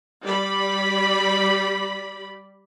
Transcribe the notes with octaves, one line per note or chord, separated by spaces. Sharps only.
G3 D5 B5